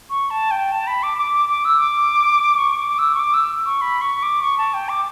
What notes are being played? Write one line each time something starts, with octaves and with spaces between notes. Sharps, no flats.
C#6
A5
G5
A5
B5
D6
D6
D6
D6
E6
D6
C#6
D6
E6
C#6
D6
E6
C#6
B5
C#6
D6
C#6
A5
G5
D6